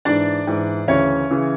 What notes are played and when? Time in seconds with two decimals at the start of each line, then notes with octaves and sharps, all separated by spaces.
0.05 G#2 E3 D4 D5
0.47 G#2 E3
0.88 D2 C#3 E3 C#4 C#5
1.30 C#3 E3